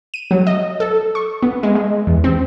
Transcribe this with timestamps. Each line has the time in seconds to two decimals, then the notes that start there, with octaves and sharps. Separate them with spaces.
0.14 D#7
0.31 F#3
0.47 D#5
0.80 A4
1.15 C#6
1.42 B3
1.63 G#3
1.75 G#3
2.07 E2
2.24 C4